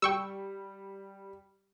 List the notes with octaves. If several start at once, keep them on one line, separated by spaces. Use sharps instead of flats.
G3 G5 C#6 E6